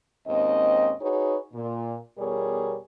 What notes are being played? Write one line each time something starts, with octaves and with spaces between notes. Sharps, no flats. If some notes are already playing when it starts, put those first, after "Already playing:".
D#2 G#2 C4 C#4 D#5
D#4 F#4 G#4 B4 C#5
A#2
E2 B2 G3 G#4 A#4 C#5